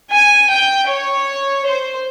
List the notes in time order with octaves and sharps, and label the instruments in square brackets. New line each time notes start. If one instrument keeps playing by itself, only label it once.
[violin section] G#5
G5
C#5
C5